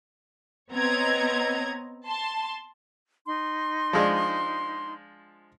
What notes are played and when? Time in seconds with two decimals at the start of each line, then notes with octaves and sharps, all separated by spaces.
0.72 B3 C4 C#5 D#5 A#5 G#6
2.06 A5 C6
3.26 D#4 C6
3.93 F3 G#3 D4